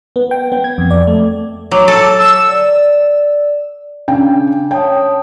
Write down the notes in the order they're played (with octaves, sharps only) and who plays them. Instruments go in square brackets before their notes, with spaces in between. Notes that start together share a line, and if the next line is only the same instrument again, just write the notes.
[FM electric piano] B3
G5
B3
G#6
F2
D5
A3
[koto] F#3 [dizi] D6
[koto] A4 [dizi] A5
[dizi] E6
[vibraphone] D5
[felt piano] C#3 G5 [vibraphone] D4
[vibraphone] C#5 A5 D#6 [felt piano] G5